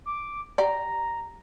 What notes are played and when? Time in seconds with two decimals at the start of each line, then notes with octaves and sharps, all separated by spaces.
0.06 D6
0.58 G4 D5 A#5